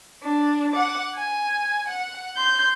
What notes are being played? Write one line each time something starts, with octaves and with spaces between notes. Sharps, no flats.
D4
F#5 D6
G#5
F#5
C6 G6